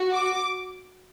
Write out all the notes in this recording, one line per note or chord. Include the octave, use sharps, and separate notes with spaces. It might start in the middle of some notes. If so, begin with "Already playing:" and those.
Already playing: F#4
D6